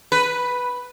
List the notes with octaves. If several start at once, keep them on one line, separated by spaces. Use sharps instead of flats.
B4